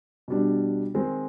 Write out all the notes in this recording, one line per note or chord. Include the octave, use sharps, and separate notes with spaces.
B2 G3 D4
D#3 G#3 C4